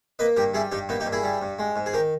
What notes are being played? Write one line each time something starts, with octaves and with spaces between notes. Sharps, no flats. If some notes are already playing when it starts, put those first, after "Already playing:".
A#3 B4 D#5
G2 G4 A#4
G3 E4 G#4
G2 D#4 G4
A#3 B3 D#4
D#4 G4
G2
E4 G#4
G3
G2
G#3
G#2
G#4
D#3 G4 A#4